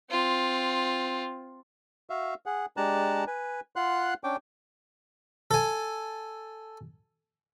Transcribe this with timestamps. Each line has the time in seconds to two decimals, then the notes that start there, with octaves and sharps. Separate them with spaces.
0.10 C4 F4
2.10 F#4 E5 F5
2.46 G#4 F#5
2.77 G#3 D4 G4 A5 A#5 F#6
3.27 B4 G#5
3.76 F4 F#5 C6 F#6
4.24 C#4 D4 G5 D6
5.51 A4 G#5